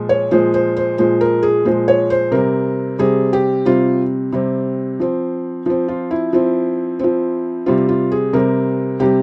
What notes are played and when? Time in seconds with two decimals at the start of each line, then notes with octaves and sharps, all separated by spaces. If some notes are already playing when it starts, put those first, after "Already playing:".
Already playing: A#2 F3 G#3
0.09 C#5
0.31 A#2 F3 G#3 C5
0.54 C5
0.77 C5
0.98 A#2 F3 G#3 C5
1.21 A#4
1.43 G#4
1.65 A#2 F3 G#3 C5
1.88 C#5
2.10 C5
2.32 C3 G3 C4 A#4
2.99 C3 G3 C4 G#4
3.33 G4
3.66 C3 G3 C4 F4
4.33 C3 G3 C4
5.00 F3 C4
5.66 F3 C4
5.88 F4
6.11 E4
6.33 F3 C4
6.99 F3 C4
7.66 C3 G3 C4 F4
7.89 F4
8.12 G#4
8.33 C3 G3 C4 A#4
9.00 C3 G3 C4 G4